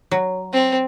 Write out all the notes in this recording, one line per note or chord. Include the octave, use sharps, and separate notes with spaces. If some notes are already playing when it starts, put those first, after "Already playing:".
F#3
C4